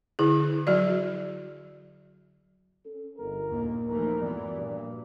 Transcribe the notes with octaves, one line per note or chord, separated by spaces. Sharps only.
D3 E4 G#4
F#3 F#4 D5
C#4 A4
G1 A#4
D#2 A#2 A#3
D#2 E3 F3 A3 A#4
A#1 G2 E3 B3 F#4 D5
G2 A#2